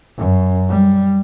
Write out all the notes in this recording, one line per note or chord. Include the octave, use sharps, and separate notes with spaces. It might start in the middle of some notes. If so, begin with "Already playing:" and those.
F#2
G3